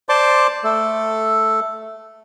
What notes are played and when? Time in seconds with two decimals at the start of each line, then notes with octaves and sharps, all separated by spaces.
0.09 C5 D5 A5 C6 D6
0.64 A3 A4